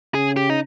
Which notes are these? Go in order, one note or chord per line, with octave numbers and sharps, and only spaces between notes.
C#3 G#4
G4
D#4